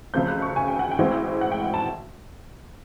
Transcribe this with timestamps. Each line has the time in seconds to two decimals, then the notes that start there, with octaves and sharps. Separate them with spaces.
0.14 C#2 C#3 F3 A3 C4 G6
0.28 F#6
0.42 C#6
0.56 G#5
0.68 G5
0.79 F#5
0.91 G5
0.99 A1 A2 E3 G#3 C4
1.41 F#5
1.52 G5
1.74 A5